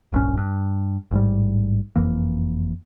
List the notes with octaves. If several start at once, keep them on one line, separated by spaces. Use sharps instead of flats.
D1 A#1 G2 C#4
G2
A1 G#2 G3
F#1 F2 E3 A#3